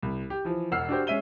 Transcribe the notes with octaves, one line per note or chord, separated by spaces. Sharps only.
C2
G4
E3 F3
E1 F#5 E6 F6 C7
D4 F#4 G4 C5
G#3 C#4 E5 D#7 G7